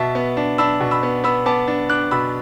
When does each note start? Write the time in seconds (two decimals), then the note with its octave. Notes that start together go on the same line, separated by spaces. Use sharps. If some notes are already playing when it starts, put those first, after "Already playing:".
Already playing: B2 E5 A5
0.15 B3
0.37 D4
0.58 D4 B5 E6
0.80 B2
0.91 B5 E6
1.03 B3
1.24 B3 B5 E6
1.46 B3 A5 D6
1.68 D4
1.89 D4 D6 F#6
2.11 B2 B5 E6